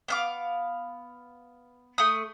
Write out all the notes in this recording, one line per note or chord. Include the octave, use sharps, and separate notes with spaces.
B3 F5 D6
A3 D#6